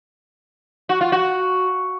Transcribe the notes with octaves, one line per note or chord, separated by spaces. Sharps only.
F#4
F4
F#4